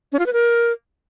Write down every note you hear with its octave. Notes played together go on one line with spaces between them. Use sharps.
C#4
F4
B4
A#4